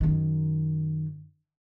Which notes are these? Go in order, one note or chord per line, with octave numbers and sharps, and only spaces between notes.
F#2 D#3